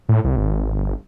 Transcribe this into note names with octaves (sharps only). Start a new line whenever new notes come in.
A2
C2
G#1
G1